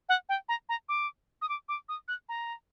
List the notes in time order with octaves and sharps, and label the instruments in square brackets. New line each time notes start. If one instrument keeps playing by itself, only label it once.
[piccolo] F#5
G5
A#5
A#5
D6
D#6
D6
D6
D#6
F#6
A#5